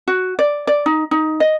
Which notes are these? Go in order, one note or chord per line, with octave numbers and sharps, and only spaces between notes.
F#4
D5
D5
D#4
D#4
D#5